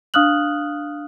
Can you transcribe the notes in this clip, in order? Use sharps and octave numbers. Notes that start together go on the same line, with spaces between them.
D4 F5 D#6 F6 F#6 F#7